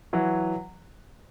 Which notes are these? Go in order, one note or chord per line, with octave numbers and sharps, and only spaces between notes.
E3 F#3